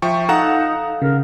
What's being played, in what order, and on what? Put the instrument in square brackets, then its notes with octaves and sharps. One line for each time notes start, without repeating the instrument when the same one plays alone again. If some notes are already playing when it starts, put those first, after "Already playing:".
[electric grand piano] F3 G5 C#6 [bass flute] E5
[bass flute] D#4 [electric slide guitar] A4 F5 [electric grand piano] F#5 A#5
[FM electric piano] C#3 [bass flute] A#4